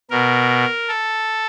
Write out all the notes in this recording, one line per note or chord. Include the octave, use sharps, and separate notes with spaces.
B2 A#4
A4